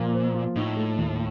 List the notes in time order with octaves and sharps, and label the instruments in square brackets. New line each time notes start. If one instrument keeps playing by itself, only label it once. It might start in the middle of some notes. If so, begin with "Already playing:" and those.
Already playing: [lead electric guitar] A#2 [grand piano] F3 A#3 F4
[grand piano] C5
F4
[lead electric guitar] A2 [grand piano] D#4
[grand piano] A3
D#2